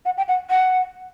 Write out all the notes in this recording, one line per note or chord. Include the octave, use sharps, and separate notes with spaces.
F#5
G5
F#5
F#5